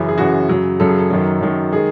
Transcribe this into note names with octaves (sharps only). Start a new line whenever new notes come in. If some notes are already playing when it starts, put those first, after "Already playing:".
Already playing: F#2 C#3 E3
G#4
F#2 C#3 E3 F#4
F#2 C#3 F#3
F#2 C#3 F#3 A4
G#4
A4
F#2 D#3 F#3
F#2 D#3 F#3
D#3 G#3 G#4